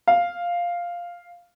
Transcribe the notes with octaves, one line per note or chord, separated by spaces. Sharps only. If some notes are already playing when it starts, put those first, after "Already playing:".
F5